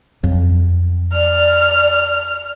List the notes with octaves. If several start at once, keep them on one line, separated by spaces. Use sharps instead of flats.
F2 F#3
D5 F6